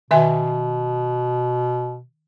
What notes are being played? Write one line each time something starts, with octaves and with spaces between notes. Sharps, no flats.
B2 D#3 E5 G#5